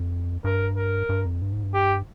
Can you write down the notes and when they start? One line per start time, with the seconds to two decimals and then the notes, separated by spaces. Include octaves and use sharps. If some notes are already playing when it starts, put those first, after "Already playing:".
Already playing: F2
0.44 G2 A#4
0.77 A#4
1.09 G2
1.25 F2
1.42 G2
1.53 G#2
1.63 G2
1.74 G4